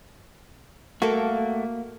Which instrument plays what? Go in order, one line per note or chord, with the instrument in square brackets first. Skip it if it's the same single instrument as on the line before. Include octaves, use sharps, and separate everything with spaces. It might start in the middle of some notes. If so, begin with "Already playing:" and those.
[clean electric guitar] A3 F#4 [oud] A#3 A4